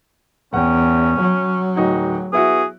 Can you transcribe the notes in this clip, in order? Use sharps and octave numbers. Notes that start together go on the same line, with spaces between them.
E2 C#4 F#5 G5
F#3
D1 D#4 F#4
B3 E4 F#4 G#4